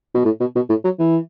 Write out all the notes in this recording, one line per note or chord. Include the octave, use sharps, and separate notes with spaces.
B2
A2
B2
B2
A2
F#3
E3